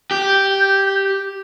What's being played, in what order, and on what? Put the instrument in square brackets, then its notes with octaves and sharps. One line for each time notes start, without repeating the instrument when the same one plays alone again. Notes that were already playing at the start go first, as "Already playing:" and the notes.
[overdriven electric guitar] G4 [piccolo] G6